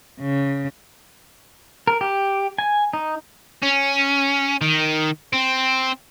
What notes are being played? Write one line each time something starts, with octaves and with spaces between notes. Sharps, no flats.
C#3
A#4
G4
G#5
D#4
C#4
D#3
C4